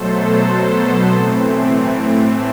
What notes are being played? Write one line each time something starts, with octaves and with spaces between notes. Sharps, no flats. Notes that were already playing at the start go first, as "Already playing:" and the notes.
Already playing: B2 F#3 A3 A4 C5
B2 F#3 B3
A2 E3 A3 C4